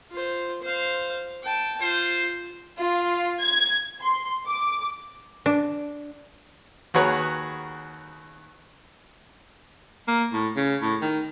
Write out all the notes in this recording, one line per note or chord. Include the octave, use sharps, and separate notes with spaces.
F4 C5
C5 F5
G5 A5
F4 C5
F4
G#6
C6
D6
D4
D#2 F#4 G#4 B4 C#5 A#5
A#3
A2
C#3
A2
D#3